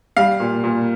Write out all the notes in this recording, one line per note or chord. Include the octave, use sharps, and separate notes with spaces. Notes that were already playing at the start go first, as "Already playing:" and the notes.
G3 F5
A#2
A#2